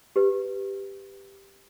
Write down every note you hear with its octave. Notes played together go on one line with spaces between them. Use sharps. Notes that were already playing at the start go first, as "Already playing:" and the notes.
G4 B4